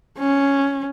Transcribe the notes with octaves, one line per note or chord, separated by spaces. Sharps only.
C#4